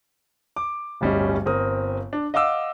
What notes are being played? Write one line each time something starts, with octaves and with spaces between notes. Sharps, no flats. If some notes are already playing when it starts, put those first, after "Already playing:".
D6
D1 G1 G3 C#4 D#5
G1 C4 A#4 D#6
D4
D#5 F5 F#5 D6 E6